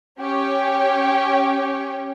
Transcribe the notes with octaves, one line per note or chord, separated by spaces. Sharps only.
C#4 G4 C#5 G5